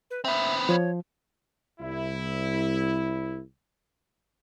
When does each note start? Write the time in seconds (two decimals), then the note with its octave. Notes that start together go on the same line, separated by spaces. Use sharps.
0.11 B4
0.25 B3 C4 E5
0.69 F3 C#5
1.80 C2 E4